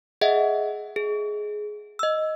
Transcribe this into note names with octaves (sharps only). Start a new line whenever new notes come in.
G#4 D#5 E5 F#5
G#4
D#5 E6